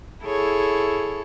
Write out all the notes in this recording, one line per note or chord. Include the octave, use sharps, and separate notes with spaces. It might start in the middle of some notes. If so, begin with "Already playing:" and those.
E4 G#4 A4 C#5